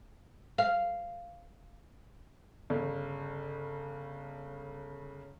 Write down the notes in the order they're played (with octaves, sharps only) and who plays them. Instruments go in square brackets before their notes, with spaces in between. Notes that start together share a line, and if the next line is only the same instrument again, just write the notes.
[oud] F5
[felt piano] G1 C#3